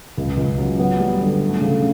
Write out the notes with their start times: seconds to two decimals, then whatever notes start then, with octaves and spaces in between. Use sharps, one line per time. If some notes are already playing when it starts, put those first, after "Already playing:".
0.17 C#2
0.37 C#2
0.58 F#3
0.79 B3
1.00 G3
1.21 D3
1.41 A3
1.61 C#3